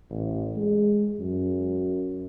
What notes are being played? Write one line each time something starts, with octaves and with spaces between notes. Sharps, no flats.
A1
G#3
F#2